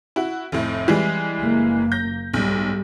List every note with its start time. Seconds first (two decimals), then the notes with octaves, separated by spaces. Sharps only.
0.16 E4 F#4
0.52 F1 A2
0.88 E3 G3 G#3
1.40 F#1 F#2 A#3
1.92 G6 A#6
2.34 B1 G#2 G3